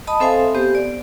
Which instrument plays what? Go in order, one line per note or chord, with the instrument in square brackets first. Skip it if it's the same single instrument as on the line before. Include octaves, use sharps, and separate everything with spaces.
[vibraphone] D#5 A5 B5 D#6
C4 A4 C5 E5 F5 G#5
B3 G4 C5
D5